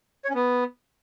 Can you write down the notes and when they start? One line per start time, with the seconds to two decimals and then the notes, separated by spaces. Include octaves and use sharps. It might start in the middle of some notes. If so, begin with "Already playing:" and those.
0.25 C#5
0.30 C#4
0.35 B3